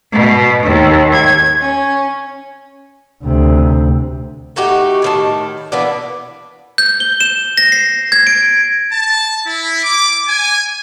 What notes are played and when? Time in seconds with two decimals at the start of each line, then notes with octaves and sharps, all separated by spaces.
0.12 B2
0.63 D#2
1.15 G#6
1.60 C#4
3.24 D2 C3
4.56 A3 D#4 F#4 G4
5.02 A2 D#3 A5
5.72 E3 A#3 B3 D4
6.78 G6
7.00 G7
7.20 E7
7.57 A#6
7.72 C7
8.12 G#6
8.27 D7
8.91 A5
9.45 E4
9.83 D6
10.27 G#5